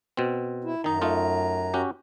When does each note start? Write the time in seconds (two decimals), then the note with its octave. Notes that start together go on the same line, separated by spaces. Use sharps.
0.17 B2 C4
0.64 E4
0.84 F#2 D#3 D#4 A#5
1.01 A3 D#4 F4
1.74 C#4 F#4 G4